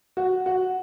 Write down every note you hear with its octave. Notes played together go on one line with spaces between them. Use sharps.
F#4
F#4